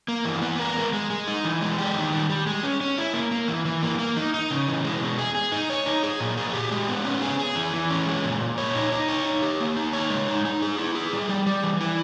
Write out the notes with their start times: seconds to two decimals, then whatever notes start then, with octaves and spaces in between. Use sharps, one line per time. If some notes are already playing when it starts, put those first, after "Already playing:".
0.08 A#3
0.25 E3
0.42 B3
0.60 A#4
0.76 G#3
0.93 G#3
1.10 G#3
1.27 D#4
1.45 E3
1.61 G#3
1.78 G4
1.95 D#3
2.13 G3
2.30 G3
2.47 G#3
2.63 C#4
2.81 C#4
2.98 E4
3.14 A#3
3.31 A#3
3.48 E3
3.65 E3
3.83 A#3
3.99 A#3
4.17 D#4
4.34 D#4
4.51 C#3
4.67 E3
4.85 G#3
5.02 B2
5.19 G#4
5.35 G#4
5.52 D#4
5.70 C#5
5.86 D#4
6.03 G#4
6.20 A#2
6.37 G#4
6.54 G4
6.71 G#3
6.89 B3
7.05 C#4
7.22 G#4
7.39 G#4
7.55 E3
7.73 E3
7.90 C#4
8.07 G#3
8.24 A#2
8.40 A#2
8.58 C#5
8.75 D#4
8.92 D#4
9.09 C#5
9.26 D#4
9.42 G4
9.60 A#3
9.76 D#4
9.93 C#5
10.10 G#3
10.28 D#4
10.45 D#4
10.62 G#4
10.78 E4
10.95 G#4
11.13 G3
11.29 G3
11.46 G3
11.64 E3
11.80 E4